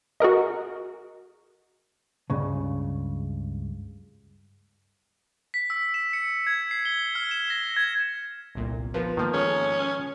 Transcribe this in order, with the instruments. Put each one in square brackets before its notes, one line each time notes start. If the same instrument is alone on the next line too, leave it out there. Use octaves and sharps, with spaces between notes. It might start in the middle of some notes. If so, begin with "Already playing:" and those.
[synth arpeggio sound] F#4 G#4 A#4 D#5
[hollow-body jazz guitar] C#2 G2 C#3
[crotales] B6
E6
E7
C#7
G#6
C7
G7
F6
E7
A#6
G#6
[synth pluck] G1 C2 A#2
[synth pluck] F3 [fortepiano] B3 F4 A#4
[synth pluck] G#2 A#3 [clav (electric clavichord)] D#3 F3
[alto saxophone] C#4 [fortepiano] G#4 A4 F6